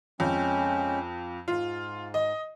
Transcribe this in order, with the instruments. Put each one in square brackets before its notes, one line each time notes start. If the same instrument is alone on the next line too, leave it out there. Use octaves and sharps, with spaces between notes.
[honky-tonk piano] F2 [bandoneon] G#3 C#4 G5
[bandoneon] G#2 [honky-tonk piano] F4
[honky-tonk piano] D#5